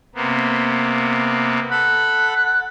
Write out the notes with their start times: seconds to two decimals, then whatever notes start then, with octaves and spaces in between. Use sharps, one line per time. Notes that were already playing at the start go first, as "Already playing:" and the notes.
0.15 C3 A#3 B3
1.71 A4 F#5 B5